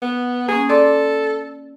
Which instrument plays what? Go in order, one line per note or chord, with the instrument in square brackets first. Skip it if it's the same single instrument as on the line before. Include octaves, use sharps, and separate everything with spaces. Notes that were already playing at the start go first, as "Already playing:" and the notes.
[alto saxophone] B3
[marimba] A#3 C#4 [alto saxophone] G#4
[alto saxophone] A4 [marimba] D5 C6 D6